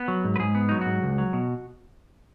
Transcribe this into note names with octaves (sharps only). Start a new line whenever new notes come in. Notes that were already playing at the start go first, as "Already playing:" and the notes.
Already playing: B3
F#3
G#2
B4
G#2 G#4
B3
F#3 D#4
G#2 F#4
C#2
F#3
B2